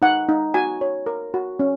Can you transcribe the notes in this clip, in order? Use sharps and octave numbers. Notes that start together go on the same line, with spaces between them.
D#4 F#5
D#4
F#4 G#5
C#5
A#4
F#4
C#4